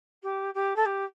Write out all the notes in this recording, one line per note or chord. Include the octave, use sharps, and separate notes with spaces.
G4
G4
A4
G4